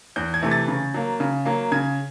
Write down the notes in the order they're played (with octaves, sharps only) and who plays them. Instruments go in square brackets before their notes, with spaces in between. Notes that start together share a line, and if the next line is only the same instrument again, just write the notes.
[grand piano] E2 G6
G#6
C3 E3 A3
A6
C#3
F#3 A#3
C#3
F#3 A#3
C#3 G#6